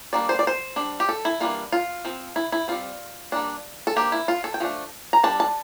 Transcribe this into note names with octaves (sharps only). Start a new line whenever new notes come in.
G3 A#3 D4 D5
C5
D5
C5
G3 D4
G4
A4
E4
E3 G3 A#3 D4 F4
F4
F3 C4
E4
E4
G3 C4 F4
G3 A#3 D4
A4
F3 A#3 D4 G4
E4
F4
A4
G5
F3 A3 D4
A#5
G3 D4 A5
A5